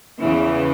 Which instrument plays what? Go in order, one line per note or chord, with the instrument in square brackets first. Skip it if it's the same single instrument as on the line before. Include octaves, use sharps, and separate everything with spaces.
[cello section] E2 C#3 E3